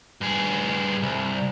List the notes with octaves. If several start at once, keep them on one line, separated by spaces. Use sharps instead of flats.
G2 G#4
C2